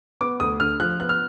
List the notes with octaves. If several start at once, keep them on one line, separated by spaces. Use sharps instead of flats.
B3 D6
D2 D#6
D3 F6
F3 F#6
B3 F#6
F6